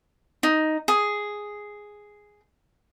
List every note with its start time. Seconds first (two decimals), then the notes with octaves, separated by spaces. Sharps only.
0.43 D#4
0.88 G#4